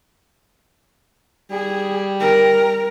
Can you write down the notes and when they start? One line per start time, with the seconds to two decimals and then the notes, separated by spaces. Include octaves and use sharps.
1.51 G3 G#4
2.20 A#4